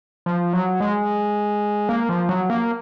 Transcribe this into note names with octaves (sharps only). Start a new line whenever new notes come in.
F3
F#3
G#3
A#3
F3
F#3
A#3